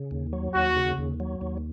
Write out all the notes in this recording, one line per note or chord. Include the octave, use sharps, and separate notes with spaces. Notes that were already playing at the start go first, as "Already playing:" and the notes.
Already playing: C#3
D#2
F#3
D#2 F#4
C#3
D#2
F#3
D#2